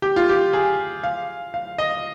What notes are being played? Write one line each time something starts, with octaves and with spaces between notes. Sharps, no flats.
G4
F4
G4
G#4
F5
F5
D#5